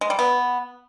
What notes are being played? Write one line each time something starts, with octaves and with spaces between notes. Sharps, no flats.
G#3
G3
B3